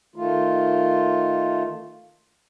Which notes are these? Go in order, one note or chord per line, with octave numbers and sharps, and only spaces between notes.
D#3 A3 F4